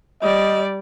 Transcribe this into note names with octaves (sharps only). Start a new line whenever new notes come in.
G3 D5 D#5